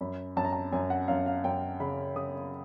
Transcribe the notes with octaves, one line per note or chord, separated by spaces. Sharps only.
F#2 B5
F#2 A5
A#5
A5
F#2 G#5
F#5
F#2 F5
F5
F#2 G5
C#3 B5
C#3 D#6